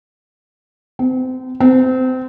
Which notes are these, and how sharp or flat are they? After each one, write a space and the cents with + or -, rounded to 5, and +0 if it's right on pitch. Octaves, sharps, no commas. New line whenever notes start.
C4 -30
C4 -25